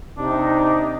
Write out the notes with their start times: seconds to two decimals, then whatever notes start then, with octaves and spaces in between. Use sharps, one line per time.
0.18 C3 D4 D#4